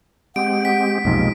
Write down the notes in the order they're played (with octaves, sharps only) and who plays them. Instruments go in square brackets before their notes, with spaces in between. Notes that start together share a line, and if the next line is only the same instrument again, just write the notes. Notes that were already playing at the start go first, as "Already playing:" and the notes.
[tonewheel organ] G#3 C4 G4 [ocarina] F#5 [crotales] D7
[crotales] B6
[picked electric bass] B1 F2 C3 [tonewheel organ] G#3 A#3 [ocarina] D#4